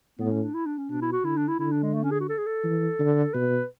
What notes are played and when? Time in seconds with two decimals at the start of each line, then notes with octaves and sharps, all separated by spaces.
0.19 A2 B3
0.31 C#4
0.43 D4
0.54 E4
0.66 D4
0.78 C#4
0.89 B2 D4
1.02 E4
1.12 F#4
1.24 D3 E4
1.37 D4
1.48 E4
1.59 D3 E4
1.71 D4
1.82 G#3
1.94 A3
2.03 C#4
2.11 G#4
2.20 F#4
2.29 A4
2.38 G#4
2.46 A4
2.64 E3
2.99 D3
3.34 B2 B4